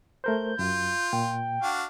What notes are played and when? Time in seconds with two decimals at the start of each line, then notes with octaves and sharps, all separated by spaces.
0.24 A3 A#4 C5 G6
0.59 F#2 F4
1.13 A#2 G5
1.62 D4 F#4 F5